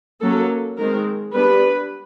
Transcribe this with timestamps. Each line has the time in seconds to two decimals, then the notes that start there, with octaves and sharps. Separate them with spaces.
0.22 F#3 A#3 C#4 A4
0.78 D#3 G#3 C4 A#4
1.33 G3 B3 D4 B4